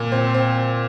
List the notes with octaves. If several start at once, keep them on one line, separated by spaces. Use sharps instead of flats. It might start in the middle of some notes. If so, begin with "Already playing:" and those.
Already playing: A#2
C4
C4